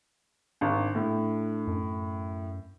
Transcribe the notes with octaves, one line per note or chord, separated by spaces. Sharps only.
G#1 D4
A2
F#2